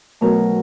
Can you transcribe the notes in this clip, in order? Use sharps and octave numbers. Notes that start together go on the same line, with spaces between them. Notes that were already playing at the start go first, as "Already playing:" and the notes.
B2 F#3 A3 A#4